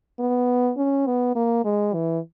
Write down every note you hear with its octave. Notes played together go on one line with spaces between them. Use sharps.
B3
C#4
B3
A#3
G#3
E3